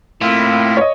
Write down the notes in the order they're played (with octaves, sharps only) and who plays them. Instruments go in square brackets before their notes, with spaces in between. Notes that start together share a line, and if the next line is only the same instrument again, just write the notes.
[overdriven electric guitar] A2 [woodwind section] A#3 C4 E4 [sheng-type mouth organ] F4
[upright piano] C#5 D#5